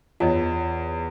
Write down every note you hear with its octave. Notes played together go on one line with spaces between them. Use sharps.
E2 F4 C#5 D#5